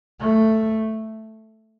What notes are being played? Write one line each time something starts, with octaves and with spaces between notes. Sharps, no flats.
A3